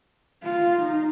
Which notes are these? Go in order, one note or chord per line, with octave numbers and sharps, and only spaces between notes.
F4
D#4